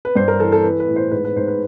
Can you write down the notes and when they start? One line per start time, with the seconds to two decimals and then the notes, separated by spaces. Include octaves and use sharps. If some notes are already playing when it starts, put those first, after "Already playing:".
0.05 B4
0.15 G2 C5
0.28 A#4
0.40 E3 A4
0.52 A4
0.63 E3 B4
0.80 B4
0.88 A2
0.96 C5
1.11 G#2 B4
1.25 B4
1.36 G#2 C5
1.48 B4